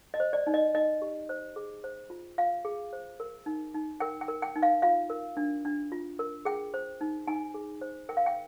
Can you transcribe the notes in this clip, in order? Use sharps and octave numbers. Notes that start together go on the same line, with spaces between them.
D#5
C5
D5
D#4
D#5
D#4 D#5
G4
C5
G#4
C5
F4
F4 F5
G#4
C5
A#4
D#4
D#4
A#4 G5
G5
A#4
G5
D#4
F5
F4 F5
A#4
D4
D4
F4
A#4
G#4 G5
C5
D#4
D#4 G#5
G#4
C5
A#4 G5
F5
G5